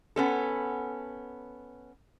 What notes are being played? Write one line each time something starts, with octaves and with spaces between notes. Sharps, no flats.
B3 C#4 A4